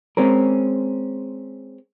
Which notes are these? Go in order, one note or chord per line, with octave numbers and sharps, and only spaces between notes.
G#3 C4 C#4 A#4